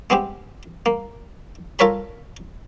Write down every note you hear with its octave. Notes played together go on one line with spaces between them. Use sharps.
G#3 B3 C4 G4
A#3
F4 A4 A#4 C#5 A#5 B5